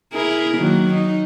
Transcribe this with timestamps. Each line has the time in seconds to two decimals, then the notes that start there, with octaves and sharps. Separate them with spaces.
0.13 E4 G#4 A#4
0.58 D#3 F#3 A#3
0.93 D#4